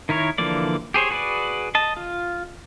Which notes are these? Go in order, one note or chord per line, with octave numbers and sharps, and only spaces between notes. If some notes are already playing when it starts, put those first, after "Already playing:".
D#3 E4 A#4 C#5
D3 E3 F3 A#3 D5
G4 G#4 C5 C#5
F#4 G#4 B4 D5
D#5 A5
F4